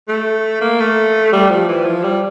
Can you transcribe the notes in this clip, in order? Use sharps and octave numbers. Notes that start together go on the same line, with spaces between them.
A3
A#3
A3
G3
F3
E3
F3
G3